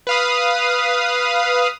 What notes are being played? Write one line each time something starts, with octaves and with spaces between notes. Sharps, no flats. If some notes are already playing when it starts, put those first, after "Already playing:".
B4 F5 D#6